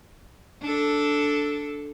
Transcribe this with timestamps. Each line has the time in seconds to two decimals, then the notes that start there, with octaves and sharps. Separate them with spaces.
0.62 D4 A4